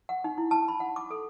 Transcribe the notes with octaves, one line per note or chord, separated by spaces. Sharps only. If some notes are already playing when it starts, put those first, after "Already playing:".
F#5
D#4
E4
A5
B5
F#5
D6
A4